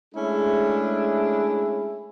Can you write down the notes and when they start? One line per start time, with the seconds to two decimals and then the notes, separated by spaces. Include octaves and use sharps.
0.15 G#3 A3 C#4 D4 E4 G#4